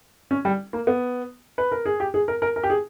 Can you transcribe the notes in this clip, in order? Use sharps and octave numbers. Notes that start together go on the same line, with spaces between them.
C#4
G3
A#3
B3
B4
A#4
G#4
G4
G#4
A#4
A#4
A#4
G4
G#4